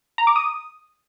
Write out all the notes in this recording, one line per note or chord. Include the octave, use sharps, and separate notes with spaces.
A#5
D6
D#6